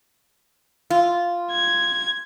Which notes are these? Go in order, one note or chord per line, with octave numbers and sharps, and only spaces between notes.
F4
G#6